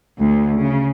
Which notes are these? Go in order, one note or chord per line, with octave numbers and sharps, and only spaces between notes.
D2
C#3